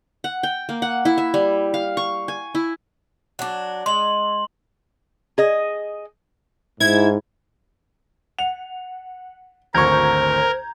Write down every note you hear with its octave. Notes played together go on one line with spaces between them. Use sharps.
F#5
G5
A#3
F#5
E4
E5
G3
F5
C#6
G#5
E4
F#3 D4
G#3 C6 F#7
G#4 D#5
G#2 E4 G#6
F#5 F7
G#1 D2 A#4 C5 A#5 C#6 G6 G#6